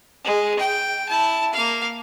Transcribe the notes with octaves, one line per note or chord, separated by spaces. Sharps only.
G#3
G5
E4 A5
A#3 F5